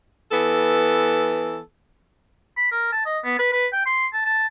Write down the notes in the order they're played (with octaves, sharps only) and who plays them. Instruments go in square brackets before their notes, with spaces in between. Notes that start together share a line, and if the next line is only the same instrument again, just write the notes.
[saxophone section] E3 B3 A4
[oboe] B5
A#4
A5
D#5
B3
B4
B4
G5
C6
A5
A5